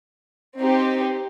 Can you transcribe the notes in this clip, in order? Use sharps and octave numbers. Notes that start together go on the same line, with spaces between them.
C4 D#4 G4